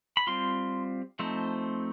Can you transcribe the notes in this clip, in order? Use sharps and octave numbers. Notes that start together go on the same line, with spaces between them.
B5
G3 C4 F4 C6
F3 A3 C4 D#4